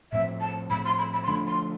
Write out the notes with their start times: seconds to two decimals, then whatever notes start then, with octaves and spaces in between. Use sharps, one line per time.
0.12 A2 F3 C4 E5
0.41 A5
0.70 A2 F3 C4 B5
0.85 C6
0.98 B5
1.13 B5
1.24 C6
1.28 D3 F3 A3 D4 B5
1.47 C6